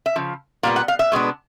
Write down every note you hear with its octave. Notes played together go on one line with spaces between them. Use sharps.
E5
C#3 F3
A#2 G3 B3 F5
F#5
F5
E5
B2 G#3 B3 D4